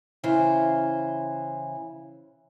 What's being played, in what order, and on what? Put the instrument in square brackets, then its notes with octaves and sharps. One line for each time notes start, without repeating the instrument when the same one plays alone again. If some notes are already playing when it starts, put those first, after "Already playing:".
[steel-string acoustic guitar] C#3 E3 C5